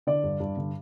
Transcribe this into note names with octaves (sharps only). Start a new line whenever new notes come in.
D3 D5
G2
G2
D3